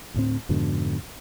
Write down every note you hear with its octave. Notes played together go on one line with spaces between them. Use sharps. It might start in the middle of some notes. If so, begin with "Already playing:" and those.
D2 A2 C4
F2 G#2 B2 D3